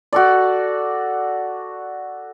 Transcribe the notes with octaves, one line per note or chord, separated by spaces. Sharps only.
F#4 A4 D5